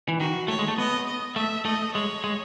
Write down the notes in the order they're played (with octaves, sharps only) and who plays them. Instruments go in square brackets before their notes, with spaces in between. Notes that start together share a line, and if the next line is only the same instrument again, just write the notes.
[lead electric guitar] E3
[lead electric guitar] D#3 [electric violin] F#4
[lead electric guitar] A3 [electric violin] C#5
[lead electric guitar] G#3
A3
[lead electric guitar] B3 [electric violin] D#5
[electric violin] D#5
[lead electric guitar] A3 [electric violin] E5
[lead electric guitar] A3 [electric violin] D#5
[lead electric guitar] G#3 [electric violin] C#5
[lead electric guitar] G#3